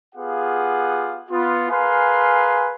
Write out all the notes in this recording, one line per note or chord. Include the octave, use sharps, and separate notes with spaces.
B3 F4 G4 G#4 F5 F#5
B3 F4
G#4 A#4 B4 F5 G#5 C6